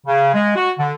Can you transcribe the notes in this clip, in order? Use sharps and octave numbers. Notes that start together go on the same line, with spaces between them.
C#3
G#3
F#4
D3